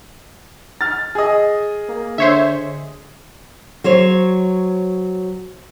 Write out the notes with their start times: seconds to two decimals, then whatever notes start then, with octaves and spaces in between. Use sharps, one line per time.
0.81 F6 A6
1.15 G#4 D#5
1.88 A#3
2.18 D3 C5 C#5 E5
3.84 F#3 C5 C#5